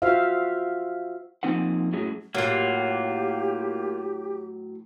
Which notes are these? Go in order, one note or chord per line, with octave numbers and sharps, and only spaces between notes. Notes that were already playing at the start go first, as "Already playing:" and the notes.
F4 F#4 C5 E5 F5
A#2 F3 C4 D#4 C5 F#5
F#2 A2 F#3 G#4
A2 F#3 A#3 F4 G4